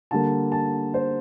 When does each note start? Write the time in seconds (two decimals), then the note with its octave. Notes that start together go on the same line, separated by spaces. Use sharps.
0.11 D3 G3 A#3 A5
0.52 A5
0.94 C5